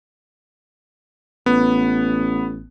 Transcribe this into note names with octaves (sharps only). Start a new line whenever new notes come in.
A1 B3